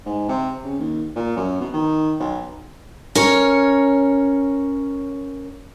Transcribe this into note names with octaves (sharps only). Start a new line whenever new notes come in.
G#2
C3
C#3
D#2
A#2
F#2
B2
D#3
B1
C#4 A#4 C#5